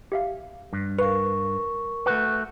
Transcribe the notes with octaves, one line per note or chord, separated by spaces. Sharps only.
G4 E5 F5
G2
A#4 B4 F5 C#6
A3 F#4 B4